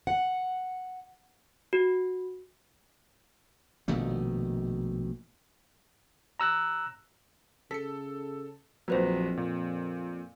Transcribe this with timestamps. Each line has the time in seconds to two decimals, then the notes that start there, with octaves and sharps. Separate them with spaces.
0.07 F#5
1.73 F#4
3.88 A#1 B2 D#3 A3
6.40 A#5 E6 F#6
7.71 C#3 A4 B6 C#7
8.88 A#1 F2 F#3 A#3 B4 C5
9.37 A#2